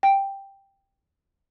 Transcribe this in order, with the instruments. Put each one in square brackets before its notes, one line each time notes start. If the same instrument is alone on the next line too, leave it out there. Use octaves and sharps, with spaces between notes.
[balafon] G5